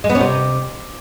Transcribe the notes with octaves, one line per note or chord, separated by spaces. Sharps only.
G#3
B3
C#4
C3